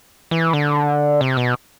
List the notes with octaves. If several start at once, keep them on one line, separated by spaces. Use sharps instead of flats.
E3
D3
C3
B2